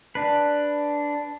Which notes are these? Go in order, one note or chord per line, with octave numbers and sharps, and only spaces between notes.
D4 B4